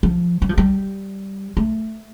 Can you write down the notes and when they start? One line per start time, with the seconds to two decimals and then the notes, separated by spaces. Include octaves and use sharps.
0.03 F3
0.42 G3
0.49 F3
0.58 G3
1.57 A3